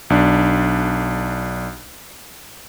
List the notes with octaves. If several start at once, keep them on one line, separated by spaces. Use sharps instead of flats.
B1 D4